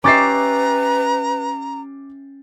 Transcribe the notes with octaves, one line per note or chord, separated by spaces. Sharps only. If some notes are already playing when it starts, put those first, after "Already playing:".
C#4 G4 B4 E5 A#5 D6 A6 C7